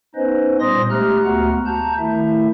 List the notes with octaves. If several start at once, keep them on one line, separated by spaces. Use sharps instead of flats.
B3 C#4 D#4 B4 C5 D#5
A#2 G3 C5 C6 D#6 A#6
G#3 A3 G4 A#5 F6 F#6
D2 A3 B3 F#4 F#5 A#5
A5 A#5 G6
D#3 A3 E4 E5